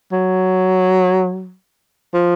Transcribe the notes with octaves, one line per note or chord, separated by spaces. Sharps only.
F#3
F3